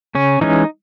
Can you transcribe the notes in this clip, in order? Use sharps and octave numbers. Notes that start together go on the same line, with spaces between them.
C#3 C#4
E3 G#3 C#4 D#4